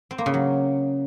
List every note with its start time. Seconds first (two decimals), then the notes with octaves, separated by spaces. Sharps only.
0.11 C4
0.18 A#3
0.26 C#3
0.34 F#3